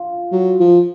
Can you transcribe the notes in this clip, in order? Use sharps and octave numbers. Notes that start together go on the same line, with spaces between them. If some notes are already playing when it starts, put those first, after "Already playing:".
Already playing: F4
F#3
F3